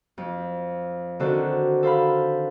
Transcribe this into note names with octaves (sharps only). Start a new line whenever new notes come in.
F2
D3 D#3 C4 F#4 A4 C5
A4 C5 F5 B5